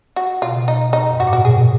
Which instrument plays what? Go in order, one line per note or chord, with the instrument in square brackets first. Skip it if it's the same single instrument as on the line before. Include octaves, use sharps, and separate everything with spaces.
[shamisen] F#4
[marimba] B2 [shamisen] F4
[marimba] C#3
B2
[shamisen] D#4
D#4
[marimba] F#2
[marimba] G#2 [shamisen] F#4
[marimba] A#2
[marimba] B2 [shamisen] F#4
[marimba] C#3 [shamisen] G#4